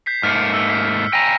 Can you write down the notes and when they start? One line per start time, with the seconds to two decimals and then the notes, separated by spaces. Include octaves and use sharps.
0.06 G6 B6 C7
0.23 G#2 A3 A#3 F6 B6 C#7
0.54 E6
0.69 B6
1.13 G5 G#5 A#5 A#6